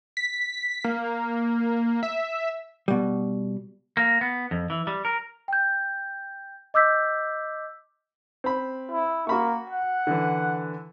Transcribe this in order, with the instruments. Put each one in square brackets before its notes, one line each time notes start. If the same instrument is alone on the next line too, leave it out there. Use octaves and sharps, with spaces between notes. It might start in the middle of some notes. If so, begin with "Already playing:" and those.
[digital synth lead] B6
A#3
E5
[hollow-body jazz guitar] B2 G3
[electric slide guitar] A#3
B3
F2
E3
G3
A#4
[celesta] G5 G6
D#5 D6 E6 G6 B6
[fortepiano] C4 B5
[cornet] E4
[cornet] A#3 [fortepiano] F#4 B5 C#6
[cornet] F#5
[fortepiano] D3 E3